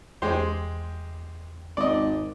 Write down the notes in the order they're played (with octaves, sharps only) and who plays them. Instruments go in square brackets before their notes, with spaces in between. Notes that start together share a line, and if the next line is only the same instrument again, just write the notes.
[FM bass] E2 [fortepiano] G#3 G4 C5
[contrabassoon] G#1 [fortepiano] D5 D#5